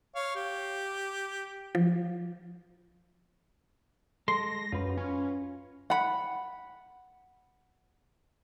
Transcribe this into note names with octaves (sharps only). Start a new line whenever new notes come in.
C#5 F5
G4
F3
G#3 A4 C6 A#6
F#2 F4 B4
C#4
F#5 B5